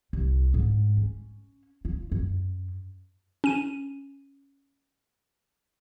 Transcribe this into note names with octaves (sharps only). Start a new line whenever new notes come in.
C2
G#2
C#4
F4
F#2
C#4 D#7